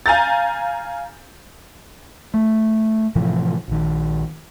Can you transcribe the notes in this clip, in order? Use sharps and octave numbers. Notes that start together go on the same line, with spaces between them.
F5 G#5 A#5 G6 A6
A3
A2 C3 E3 F3
A#1 D#3